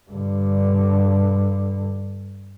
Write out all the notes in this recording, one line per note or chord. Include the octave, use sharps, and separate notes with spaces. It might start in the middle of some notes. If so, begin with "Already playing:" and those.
G2 D3